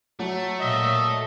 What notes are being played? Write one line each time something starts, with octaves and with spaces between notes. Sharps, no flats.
F#3 A3
A#2 D#5 E5